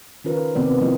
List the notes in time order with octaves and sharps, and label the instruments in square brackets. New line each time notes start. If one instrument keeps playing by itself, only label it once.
[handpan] D#3 C#4 F4 A#4 B4
C3 D#3 B3 C4 D5
F3 A#3 B3 E4 F4 D#5